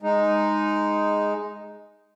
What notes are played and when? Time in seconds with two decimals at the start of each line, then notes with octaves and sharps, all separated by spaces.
0.02 G#3 D#4